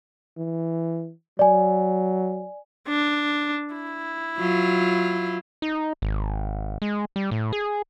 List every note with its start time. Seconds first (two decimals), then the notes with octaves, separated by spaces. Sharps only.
0.37 E3
1.39 F#3 D5 G#5
2.88 D4
3.74 E4
4.38 F#3 F4
5.62 D#4
6.02 G#1
6.82 G#3
7.16 G3
7.31 A2
7.53 G#4